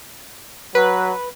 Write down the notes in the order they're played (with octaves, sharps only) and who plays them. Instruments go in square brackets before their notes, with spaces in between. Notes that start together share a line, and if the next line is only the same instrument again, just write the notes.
[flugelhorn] F#3 [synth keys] B4